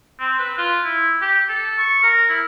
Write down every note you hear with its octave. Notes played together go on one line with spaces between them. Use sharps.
C4
B4
F4
E4
G4
A4
C#6
A#4
E4